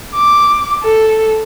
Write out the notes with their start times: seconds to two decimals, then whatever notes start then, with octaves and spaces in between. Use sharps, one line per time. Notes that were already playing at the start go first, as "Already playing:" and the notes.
0.15 D6
0.83 A4